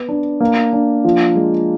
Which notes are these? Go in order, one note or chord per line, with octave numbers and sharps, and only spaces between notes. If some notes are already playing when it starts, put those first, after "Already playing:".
Already playing: B3
D4
A#3
D4
F3
G#3